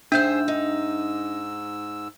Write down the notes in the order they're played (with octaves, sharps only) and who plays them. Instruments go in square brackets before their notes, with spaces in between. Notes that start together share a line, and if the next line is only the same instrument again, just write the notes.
[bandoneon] G#2 E6 [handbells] D4 G6 [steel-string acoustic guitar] G#4 C5 E5
[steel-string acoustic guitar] D#4